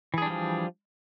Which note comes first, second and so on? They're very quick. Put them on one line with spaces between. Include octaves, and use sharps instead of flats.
E3 G#4 D4 G3 F3